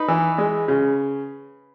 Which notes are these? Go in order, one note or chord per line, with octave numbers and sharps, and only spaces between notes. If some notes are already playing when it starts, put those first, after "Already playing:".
Already playing: D#4 B4
E3
G#3
C#3